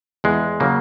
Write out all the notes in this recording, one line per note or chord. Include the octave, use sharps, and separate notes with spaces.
E2 G#3
C#3 F#3 A#3